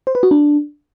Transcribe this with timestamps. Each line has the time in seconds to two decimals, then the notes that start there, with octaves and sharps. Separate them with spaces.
0.07 C5
0.15 B4
0.23 F#4
0.31 D4